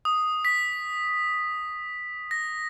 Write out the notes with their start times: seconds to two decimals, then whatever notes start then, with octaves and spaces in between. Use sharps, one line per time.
0.05 D#6
0.45 B6
2.31 A#6